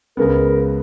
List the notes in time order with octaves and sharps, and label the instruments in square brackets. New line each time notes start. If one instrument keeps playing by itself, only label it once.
[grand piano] C#2 C#3 G#3 B3 [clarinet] A#4